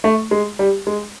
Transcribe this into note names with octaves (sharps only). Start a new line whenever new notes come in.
A3
G#3
G3
G#3